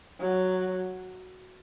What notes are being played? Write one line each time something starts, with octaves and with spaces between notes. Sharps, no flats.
F#3